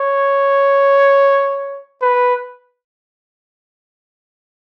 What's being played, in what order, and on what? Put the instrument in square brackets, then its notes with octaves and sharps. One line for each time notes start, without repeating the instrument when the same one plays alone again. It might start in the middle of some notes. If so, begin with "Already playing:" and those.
Already playing: [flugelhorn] C#5
B4